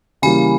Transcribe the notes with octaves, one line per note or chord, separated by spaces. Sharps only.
C#3 E3 G3 A#3 G#5 B5